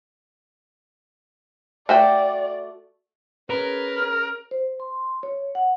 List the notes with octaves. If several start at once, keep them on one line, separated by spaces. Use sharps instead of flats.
A3 F#4 D5 G5
C#4 G#4 A#4 B4
F6
C5
C6
C#5
F#5